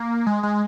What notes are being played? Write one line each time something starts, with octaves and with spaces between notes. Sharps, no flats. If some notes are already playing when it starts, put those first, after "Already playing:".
Already playing: A#3
G#3
G#3